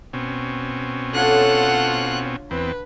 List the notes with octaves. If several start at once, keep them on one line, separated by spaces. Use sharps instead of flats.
B2 C4 C#4
D3 F4 A4 C#5 F#5 F#6
E2 C4 B4